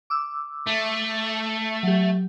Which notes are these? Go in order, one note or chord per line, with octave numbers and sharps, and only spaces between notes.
D6 E6
A3
F#3 G4